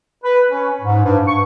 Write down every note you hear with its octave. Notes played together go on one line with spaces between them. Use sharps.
B4
C#4
G#2
G2
C#6